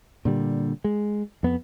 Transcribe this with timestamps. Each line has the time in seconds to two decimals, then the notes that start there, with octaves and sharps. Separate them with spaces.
0.25 A#2 D3 G3
0.84 G#3
1.43 F2 B3